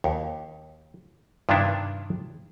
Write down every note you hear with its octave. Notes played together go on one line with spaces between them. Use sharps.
D#2
G2 C3 D#3 B3 D4 E4